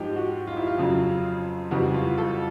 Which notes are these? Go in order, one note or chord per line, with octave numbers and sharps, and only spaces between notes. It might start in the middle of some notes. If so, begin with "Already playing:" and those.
Already playing: G#2 F3 G#3 G4
F#4
F4
E4
F4
F2 C#3 F#3
F2 C#3 E3 G3 F#4
F4
A4